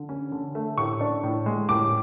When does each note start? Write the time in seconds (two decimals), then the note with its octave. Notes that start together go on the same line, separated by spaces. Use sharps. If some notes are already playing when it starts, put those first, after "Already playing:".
Already playing: D3
0.09 C#4
0.32 D3
0.55 A3
0.78 A2 C#6
1.01 D4
1.23 A2
1.46 G#3
1.69 A2 D6